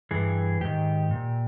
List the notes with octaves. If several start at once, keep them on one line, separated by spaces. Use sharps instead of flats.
G2 E3 G#4
G#2 D#3 G4
A#2